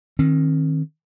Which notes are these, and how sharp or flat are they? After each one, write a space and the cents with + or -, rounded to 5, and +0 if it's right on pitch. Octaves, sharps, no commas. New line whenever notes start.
D#3 +0 C4 +40